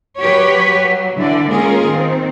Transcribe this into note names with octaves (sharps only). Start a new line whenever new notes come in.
F#3 G4 B4 C#5
F#3
D3 E3 E4 D5
G#3 A#3 C#4 F4 G#4 A#4
D#3 C4